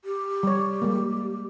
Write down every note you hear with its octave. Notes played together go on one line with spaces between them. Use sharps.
G4
G3 C#5
G3 G#3 A#3